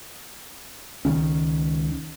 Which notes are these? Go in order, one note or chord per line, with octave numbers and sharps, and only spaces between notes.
C#2 D#3 C#4